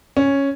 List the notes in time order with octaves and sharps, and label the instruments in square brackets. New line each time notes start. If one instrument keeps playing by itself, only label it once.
[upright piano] C#4